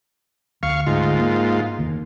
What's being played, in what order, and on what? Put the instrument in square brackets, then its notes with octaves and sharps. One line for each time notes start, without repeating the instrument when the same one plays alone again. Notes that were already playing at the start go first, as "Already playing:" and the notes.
[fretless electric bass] D2 [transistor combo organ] F5 C#6
[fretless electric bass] D2 [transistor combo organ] G#2 F4
[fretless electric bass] A#3
F1 D#2